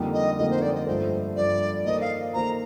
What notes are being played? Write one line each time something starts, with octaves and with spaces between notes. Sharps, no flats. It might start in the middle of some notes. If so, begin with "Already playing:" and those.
Already playing: F2 D3 G3 A#3 D#4
D#5
F2 D3 G3 A#3 D#4 D#5
C5
D5
D#5
G2 F3 A3 C5
G2 F3 A3 D5
D#3 A#3 D#4 A4 C5 D#5
F5
D#3 A#3 D#4 A4 C5 A#5